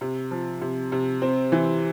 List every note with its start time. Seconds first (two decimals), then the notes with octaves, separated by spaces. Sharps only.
0.01 C3
0.31 F3
0.61 C3
0.92 C3
1.22 C4
1.52 E3